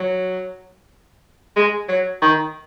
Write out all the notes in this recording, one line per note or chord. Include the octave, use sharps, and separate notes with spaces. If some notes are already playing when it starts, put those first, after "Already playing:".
Already playing: F#3
G#3
F#3
D#3